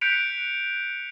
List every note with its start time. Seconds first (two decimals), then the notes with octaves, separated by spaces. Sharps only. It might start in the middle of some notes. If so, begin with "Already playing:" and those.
0.01 F#6 G6 B6 C#7 D7 F7